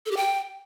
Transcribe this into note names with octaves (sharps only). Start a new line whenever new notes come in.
A4
G4
G5